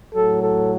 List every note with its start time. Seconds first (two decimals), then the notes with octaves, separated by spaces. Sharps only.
0.15 A2 F#3 A4
0.43 A4